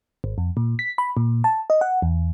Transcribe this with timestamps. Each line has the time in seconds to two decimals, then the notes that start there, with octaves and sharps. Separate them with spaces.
0.24 G#1
0.38 F2
0.57 A#2
0.79 B6
0.98 B5
1.17 A#2
1.44 A5
1.70 D#5
1.81 F#5
2.02 E2